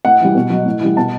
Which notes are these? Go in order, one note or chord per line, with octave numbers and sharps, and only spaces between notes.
A2 F#5
E3 G3
B2
F#3
A2
E3 G3
B2 A5